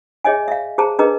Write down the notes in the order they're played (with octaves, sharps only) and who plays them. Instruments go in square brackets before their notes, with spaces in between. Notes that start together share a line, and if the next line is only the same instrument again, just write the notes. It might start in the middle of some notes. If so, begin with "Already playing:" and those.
[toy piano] G#4 C#5 D#5 E5 G#5
E5 F5
G#4 C5 A5 A#5
D4 G#4 A#4 B4 D#5 A#5